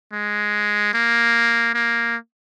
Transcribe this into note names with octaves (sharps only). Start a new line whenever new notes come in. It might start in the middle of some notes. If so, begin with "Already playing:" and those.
G#3
A#3
A#3